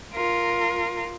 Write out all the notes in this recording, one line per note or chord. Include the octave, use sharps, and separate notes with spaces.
F4 A#4